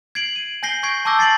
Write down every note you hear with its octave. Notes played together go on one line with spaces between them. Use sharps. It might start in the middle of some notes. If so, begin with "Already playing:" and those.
G#6 C7 D7 F#7
D#7
G#5 G6 A#6 C7 G7
C#6 G6 G#6 C7 D7
A5 C#6 D6 E6 G6 A#6
A6 C7 D7 F#7